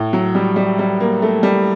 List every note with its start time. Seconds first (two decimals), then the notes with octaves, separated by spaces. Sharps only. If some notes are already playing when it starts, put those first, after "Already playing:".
Already playing: A2
0.13 F#3
0.35 G3
0.56 G3
0.79 G3
1.00 A#3
1.22 A3
1.43 G3